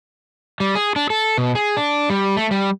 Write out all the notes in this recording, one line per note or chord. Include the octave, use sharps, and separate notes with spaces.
G3
G#4
D4
A4
B2
G#4
D4
G3
A3
G3